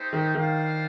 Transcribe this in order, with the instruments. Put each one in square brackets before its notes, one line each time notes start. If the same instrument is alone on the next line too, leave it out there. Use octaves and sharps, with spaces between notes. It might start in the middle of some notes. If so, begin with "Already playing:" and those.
Already playing: [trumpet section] A3 D#4 G4 C5
[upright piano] D#3
[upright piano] D#3 [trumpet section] D4 F4 C5 F5